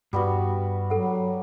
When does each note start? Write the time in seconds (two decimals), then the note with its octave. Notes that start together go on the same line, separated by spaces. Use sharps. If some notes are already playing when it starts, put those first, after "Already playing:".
0.13 G2 G3 B3 F#4
0.90 F#3 A4 F#5